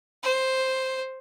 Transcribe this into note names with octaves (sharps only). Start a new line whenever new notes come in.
C5